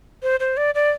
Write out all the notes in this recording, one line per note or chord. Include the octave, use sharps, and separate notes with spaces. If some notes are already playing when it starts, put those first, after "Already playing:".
C5
C5
D5
D5